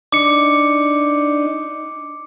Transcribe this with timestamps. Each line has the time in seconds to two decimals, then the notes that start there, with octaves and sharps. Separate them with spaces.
0.12 D4 D#4 D6 C#7